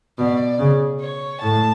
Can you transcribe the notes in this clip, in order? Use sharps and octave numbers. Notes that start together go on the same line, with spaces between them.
B2 D5
C#3
C#5
A2 A5